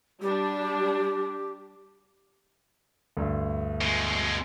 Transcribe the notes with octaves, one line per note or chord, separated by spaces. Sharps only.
G3 D4 G4
D2 G2
B2 G#3